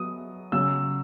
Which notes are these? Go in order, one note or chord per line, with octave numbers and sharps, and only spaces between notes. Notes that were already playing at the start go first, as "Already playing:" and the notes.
Already playing: F#3 B3 D#6
C#3 F#3 E6